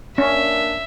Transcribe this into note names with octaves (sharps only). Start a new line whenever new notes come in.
A#3 C#4 D4 E5